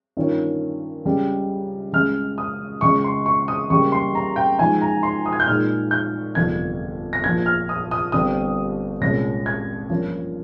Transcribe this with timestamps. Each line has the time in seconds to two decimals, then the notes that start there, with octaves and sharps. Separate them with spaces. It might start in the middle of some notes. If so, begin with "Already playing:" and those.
0.17 G2 D#3 A#3 C#4 F4
1.05 C#2 C#3 G3
1.93 C#2 C#3 G#3 F6
2.38 D#6
2.81 C#2 C#3 G#3 C#6
3.04 C6
3.26 C#6
3.48 D#6
3.70 C#2 C#3 G3 A#3 C#6
3.92 C6
4.15 A#5
4.36 G5
4.59 G#2 F3 G#3 G#5
4.82 A#5
5.03 C6
5.26 D#6
5.33 G#6
5.40 G6
5.47 A#2 G#3 D#4 F6
5.91 G6
6.35 G1 F2 C3 F3 G#6
7.13 A#6
7.24 A#1 A#2 F3 G#6
7.46 F6
7.69 D#6
7.91 D#6
8.12 G1 G2 G3 C4 D#6
9.01 C2 A#2 G#3 C#4 A#6
9.46 G#6
9.89 G2 F3 A#3 C#4 F4